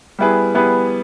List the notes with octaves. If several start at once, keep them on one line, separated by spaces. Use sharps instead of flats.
G3 B3 E4 G#4 B4
G3 B3 E4 G#4 B4